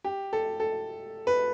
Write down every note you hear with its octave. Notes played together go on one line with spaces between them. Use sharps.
G4
A4
A4
B4